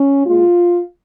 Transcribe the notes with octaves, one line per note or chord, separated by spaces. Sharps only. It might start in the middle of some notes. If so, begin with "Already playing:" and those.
Already playing: C#4
A#2 G#3 F4